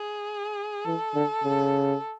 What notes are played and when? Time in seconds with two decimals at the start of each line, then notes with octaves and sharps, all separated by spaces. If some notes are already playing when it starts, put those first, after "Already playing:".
Already playing: G#4
0.85 E3 A4
1.15 D3
1.44 C#3